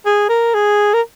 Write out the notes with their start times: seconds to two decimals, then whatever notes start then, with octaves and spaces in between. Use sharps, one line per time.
0.06 G#4
0.29 A#4
0.54 G#4
0.94 A#4